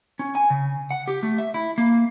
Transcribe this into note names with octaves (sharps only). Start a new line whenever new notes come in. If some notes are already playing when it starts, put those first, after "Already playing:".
C#4
G#5
C#3
F#5
G4
A3
E5
E4
A#3